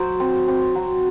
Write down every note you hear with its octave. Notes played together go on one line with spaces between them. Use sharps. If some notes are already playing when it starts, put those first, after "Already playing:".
Already playing: F#3 C5
C4
C4
F#3